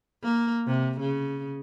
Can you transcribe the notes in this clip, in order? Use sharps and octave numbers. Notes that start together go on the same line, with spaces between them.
A#3
C3
C#3